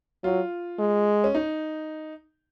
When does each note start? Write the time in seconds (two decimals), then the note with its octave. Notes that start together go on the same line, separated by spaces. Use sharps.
0.24 F#3 F4
0.79 G#3
1.24 C#4
1.35 D#4